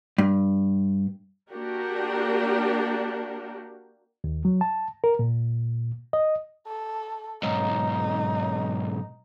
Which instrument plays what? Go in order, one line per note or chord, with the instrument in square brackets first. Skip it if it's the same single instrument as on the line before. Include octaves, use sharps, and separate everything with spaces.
[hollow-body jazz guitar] G2
[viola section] A#3 D4 F#4 G4 A#4
[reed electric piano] D#2
F#3
A5
A#4
A#2
D#5
[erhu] A4
[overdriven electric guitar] B1 G#2 [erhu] D#4